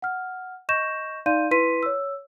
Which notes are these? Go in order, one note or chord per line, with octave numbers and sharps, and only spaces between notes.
F#5 F6
D#5 C#6 G6 A#6 E7
D#4 D5 F5 C6 G6 D#7
E4 B4 C6 B6 D#7
C#5 E6